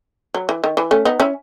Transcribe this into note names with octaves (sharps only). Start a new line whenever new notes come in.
F#3
E3
D#3
E3
A3 C#4
B3 D#4
C#4 E4